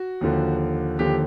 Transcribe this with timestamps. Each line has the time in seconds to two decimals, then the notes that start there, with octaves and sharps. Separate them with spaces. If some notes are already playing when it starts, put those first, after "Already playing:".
Already playing: F#4
0.21 D#2 D3 F3
0.99 D#2 D3 F3 G4